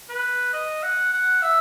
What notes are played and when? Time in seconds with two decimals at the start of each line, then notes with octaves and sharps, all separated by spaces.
0.09 B4
0.53 D#5
0.83 F#5
1.13 F#5
1.42 E5